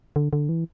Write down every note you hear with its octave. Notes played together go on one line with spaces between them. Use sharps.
D3
D3
E3